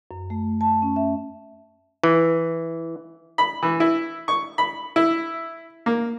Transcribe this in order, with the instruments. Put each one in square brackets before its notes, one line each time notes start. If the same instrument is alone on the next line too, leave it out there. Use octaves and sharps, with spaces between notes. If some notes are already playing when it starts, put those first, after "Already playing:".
[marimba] F#2
A3
A5
C#4
E5
[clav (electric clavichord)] E3
[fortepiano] B5
E3
E4
C#6
B5
E4
A#3